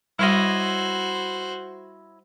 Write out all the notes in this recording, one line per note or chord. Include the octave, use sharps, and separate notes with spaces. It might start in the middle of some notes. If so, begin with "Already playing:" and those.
G3 E4 F#4 C5 C#5 D#5